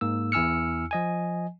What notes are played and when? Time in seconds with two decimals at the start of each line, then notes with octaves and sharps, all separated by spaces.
0.01 G#2 A#3 E6
0.32 E2 E4 G#5 E6 F6 C#7
0.91 F3 D#5 G#5